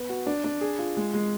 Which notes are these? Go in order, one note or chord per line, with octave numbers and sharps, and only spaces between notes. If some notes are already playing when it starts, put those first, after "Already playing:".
Already playing: B3
F#4
D4
D4
G#4
F4
G#3
G#3